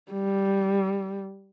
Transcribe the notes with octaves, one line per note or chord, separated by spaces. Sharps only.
G3